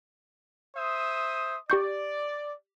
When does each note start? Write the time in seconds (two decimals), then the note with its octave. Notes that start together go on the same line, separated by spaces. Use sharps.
0.75 C5 E5 D#6
1.70 G4 D5 C#6 G6